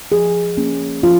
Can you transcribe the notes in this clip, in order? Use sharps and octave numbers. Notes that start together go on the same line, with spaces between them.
F3 G#4
A#3 C#4
F3 F4